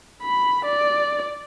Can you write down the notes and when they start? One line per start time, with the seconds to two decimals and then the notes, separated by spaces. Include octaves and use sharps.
0.23 B5
0.65 D5